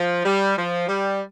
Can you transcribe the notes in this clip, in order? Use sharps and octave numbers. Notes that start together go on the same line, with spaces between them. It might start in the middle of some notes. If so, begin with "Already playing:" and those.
Already playing: F3
G3
F3
G3